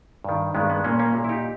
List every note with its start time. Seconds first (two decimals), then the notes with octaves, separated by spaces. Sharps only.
0.24 G2 D#3
0.55 G2 D#3 G#3 B3
0.69 G#3 B3
0.84 A#2 A#3 C#4
0.99 A#3 C#4
1.15 A#2
1.24 E4
1.29 D#4 G4